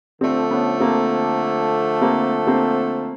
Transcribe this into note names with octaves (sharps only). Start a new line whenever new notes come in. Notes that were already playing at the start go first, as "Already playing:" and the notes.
D3 F3 A3 C4 D4
B3 C#4
A#3 C4
A#3 C4
A#3 C4